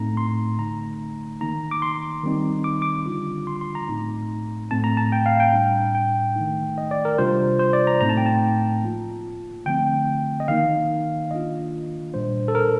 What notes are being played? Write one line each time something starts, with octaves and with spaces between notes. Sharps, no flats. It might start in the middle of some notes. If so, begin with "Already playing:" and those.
Already playing: A2 A3 C4 D#4 A#5
C6
D3 A3 D#4 A#5
D#3 A#3 D#4 A#5
D6
C6
D#3 G3 C4 D#4
D6
D6
D3 G3 D4 F4
C6
C6
A#5
A2 A3 C4 D#4
A2 A3 C4 A5
A#5
A5
G5
F5
G5
A2 G3 D4
G5
D#3 A3 D#4
D#5
D5
A#4
C3 G3 D4 F4 C5
C5
D5
A#5
A2 A3 C4 D#4 A#5
A5
G5
A5
F3 A#3 F4
D3 F3 A3 C4 G5
D#5
D#3 A#3 D#4 F5
D#3 A#3 D4 F4 D#5
A#2 G3 D4 C5
A4
A#4